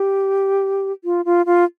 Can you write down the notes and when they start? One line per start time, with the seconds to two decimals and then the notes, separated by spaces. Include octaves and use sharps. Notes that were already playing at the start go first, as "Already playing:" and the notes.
Already playing: G4
1.04 F4
1.25 F4
1.46 F4